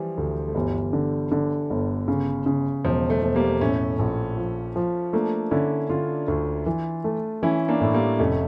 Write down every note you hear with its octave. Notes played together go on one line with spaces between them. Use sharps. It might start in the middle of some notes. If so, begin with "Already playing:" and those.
Already playing: E3 F3 G3
D2
A3
G1 E3 G3
D3
D3
G1
C#3
C#3
E1 F3
F3 A3
E1
G3 A#3
A2 A3 C#4
A#1
F3
F3
A3 A#3 D4
D3 C#4 E4
D3 D4 F4
D2
E3
A3
E3 C#4 E4
A#3 D4
A2
G3 A#3
F1 A3 C#4